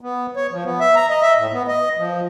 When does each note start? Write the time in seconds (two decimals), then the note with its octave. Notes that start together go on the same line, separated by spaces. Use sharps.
0.01 B3
0.36 C#5
0.51 F3
0.65 B3
0.80 E5
0.95 A#5
1.10 D#5
1.22 E5
1.37 A2
1.53 B3
1.67 D#5
1.98 F3